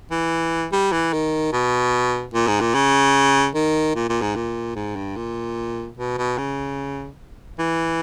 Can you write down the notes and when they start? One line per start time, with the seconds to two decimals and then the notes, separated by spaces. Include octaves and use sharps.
0.11 E3
0.72 G3
0.92 E3
1.13 D#3
1.52 B2
2.34 A#2
2.47 G#2
2.61 A#2
2.74 C#3
3.55 D#3
3.95 A#2
4.09 A#2
4.21 G#2
4.35 A#2
4.76 G#2
4.96 G2
5.16 A#2
5.98 B2
6.18 B2
6.38 C#3
7.59 E3